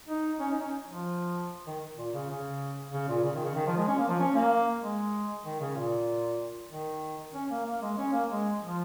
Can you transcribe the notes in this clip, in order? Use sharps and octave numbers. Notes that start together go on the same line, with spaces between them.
D#4
C#4
D#4
C#4
F3
D#3
A#2
C#3
C#3
C#3
A#2
C#3
D#3
C#3
D#3
F3
G#3
C#4
A#3
F3
C#4
A#3
G#3
D#3
C#3
A#2
D#3
C#4
A#3
A#3
G#3
C#4
A#3
G#3
F3